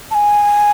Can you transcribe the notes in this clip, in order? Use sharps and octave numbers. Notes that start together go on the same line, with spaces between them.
A5
G#5